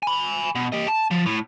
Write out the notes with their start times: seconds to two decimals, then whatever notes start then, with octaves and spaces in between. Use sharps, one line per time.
0.03 G#5 B5
0.56 B2
0.73 G4 D#5
0.89 A5
1.11 F3
1.26 A2